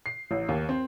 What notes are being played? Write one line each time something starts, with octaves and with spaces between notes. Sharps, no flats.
C7
A1
D#2
C4